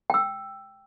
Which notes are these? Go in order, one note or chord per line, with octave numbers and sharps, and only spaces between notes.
G5 E6